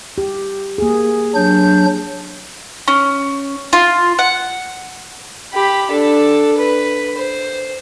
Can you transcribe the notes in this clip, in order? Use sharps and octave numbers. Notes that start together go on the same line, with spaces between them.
G4
A#3 G#4
F#3 D4 G6
C#4
F4
F#5
G4 B5
D4 A4
B4
C5